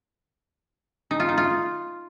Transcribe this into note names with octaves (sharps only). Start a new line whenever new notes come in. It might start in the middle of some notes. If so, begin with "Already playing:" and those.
D#4
F4
D#4
F4